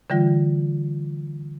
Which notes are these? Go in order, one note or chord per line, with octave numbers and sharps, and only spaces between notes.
D3 E3 G3 F4